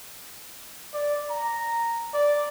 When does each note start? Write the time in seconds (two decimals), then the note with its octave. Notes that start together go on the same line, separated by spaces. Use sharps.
0.93 D5
1.30 A#5
2.14 D5